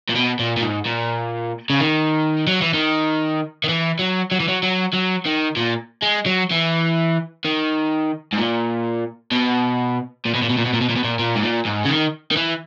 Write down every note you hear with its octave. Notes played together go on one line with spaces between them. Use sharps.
A#2
B2
A#2
A#2
G#2
A#2
C#3
D#3
F#3
E3
D#3
D#3
E3
F#3
F#3
E3
F#3
F#3
F#3
D#3
A#2
G#3
F#3
E3
D#3
G#2
A#2
B2
A#2
B2
A#2
B2
A#2
B2
A#2
B2
A#2
B2
A#2
A#2
G#2
A#2
G#2
C#3
D#3
D#3
E3